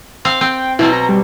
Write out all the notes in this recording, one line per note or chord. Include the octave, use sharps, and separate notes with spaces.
C4 F5
C4 G5
B2 F#3 C4 E4
A#5
G3